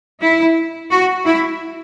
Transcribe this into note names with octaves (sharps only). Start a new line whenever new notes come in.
E4
F#4
E4